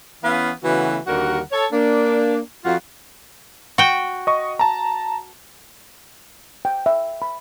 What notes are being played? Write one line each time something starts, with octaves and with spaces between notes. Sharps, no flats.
E3 B3 C#4 B4 F5
C#3 E3 A3 B3 F#4
D#2 D3 G3 F#4 A#4 F#5
A4 C#5
A#3 D4
F2 F4 F#4
F#4 G5
D#5 C#6
A5 A#5
G5
E5
B5